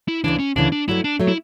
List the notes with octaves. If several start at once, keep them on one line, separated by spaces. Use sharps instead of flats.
E4
D2 C#3 E3 D4
C#4
D2 C#3 E3 D4
D4
G2 F#3 A3 E4
D4
F#3 A3
E4